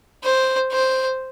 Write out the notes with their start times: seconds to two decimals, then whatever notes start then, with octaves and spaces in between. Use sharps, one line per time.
0.24 C5
0.72 C5